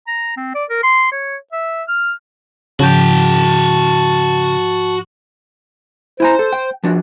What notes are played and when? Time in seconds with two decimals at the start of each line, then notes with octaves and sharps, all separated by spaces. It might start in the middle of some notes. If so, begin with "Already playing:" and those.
0.07 A#5
0.37 C4
0.55 D5
0.70 A#4
0.83 C6
1.12 C#5
1.52 E5
1.88 F6
2.80 G#2 C#3 F3 F#4 G5 A5 G6
6.20 E4 C5 G#5 A#5
6.39 A4
6.53 G5
6.83 F3 D4 F#4